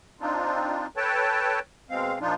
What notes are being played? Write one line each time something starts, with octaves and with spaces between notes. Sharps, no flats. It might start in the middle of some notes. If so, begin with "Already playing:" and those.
C4 D4 D#4 F4
A4 B4 C#5 G5 A5
B2 G#3 C4 F5
A#2 F3 D4 D#4 F4